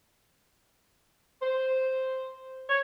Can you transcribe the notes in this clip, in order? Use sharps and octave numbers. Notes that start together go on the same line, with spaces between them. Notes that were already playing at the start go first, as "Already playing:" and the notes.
C5
C#5